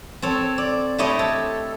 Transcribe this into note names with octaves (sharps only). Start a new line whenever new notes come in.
C4 A4 C#5
D5
A3 E4 G4 C#5 D#5 G5
A4